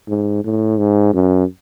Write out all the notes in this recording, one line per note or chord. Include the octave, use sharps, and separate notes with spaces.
G#2
A2
G#2
F#2